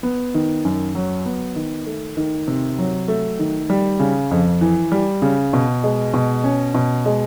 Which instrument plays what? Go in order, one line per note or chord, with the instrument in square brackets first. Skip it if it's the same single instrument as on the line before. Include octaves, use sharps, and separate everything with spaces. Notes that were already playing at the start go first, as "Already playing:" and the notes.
[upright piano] B3
D#3
F#2
F#3
B3
D#3
A3
D#3
C3
F#3
A3
D#3
G3
C#3
F2
E3
G3
C#3
B2
G#3
B2
C#4
B2
G#3